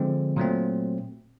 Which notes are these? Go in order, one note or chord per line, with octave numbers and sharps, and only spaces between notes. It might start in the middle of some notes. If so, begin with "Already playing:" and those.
Already playing: D3 F3 G#3 C4
A#2 F#3 A3 C4